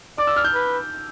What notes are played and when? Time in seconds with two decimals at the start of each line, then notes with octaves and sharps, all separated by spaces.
0.18 D5 D6
0.27 E6
0.36 F6
0.44 G6
0.54 B4